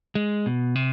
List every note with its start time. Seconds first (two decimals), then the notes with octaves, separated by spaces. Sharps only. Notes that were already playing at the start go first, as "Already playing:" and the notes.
0.15 G#3
0.46 B2
0.75 C3